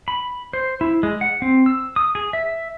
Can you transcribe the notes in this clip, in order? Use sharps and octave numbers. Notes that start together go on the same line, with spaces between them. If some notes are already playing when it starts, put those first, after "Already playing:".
B5
C5
E4
G#3
F#5
C4
E6
D#6
G#4
E5